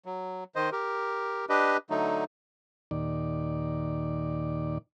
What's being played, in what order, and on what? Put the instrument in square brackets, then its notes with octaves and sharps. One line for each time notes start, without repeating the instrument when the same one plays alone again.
[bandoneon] F#3
D#3 C5 D#5
G4 A#4
D4 G4 B4 D#5
D3 F#3 A3 D#4
[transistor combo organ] D#2 A#2 D#3 D5